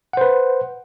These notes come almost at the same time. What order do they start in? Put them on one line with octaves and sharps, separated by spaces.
F#5 C5 B4